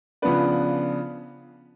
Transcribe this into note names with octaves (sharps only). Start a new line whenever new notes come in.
C#3 F3 B3 D4 B4